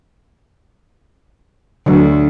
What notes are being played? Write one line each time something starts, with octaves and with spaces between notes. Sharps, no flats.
D2 D3 F#3